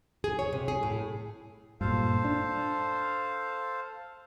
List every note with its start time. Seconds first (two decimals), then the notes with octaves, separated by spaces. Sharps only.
0.24 G#4
0.39 C#5
0.53 C3
0.68 G#4
0.83 A2
1.81 G2 A#2 A4 C5 F5
2.25 D4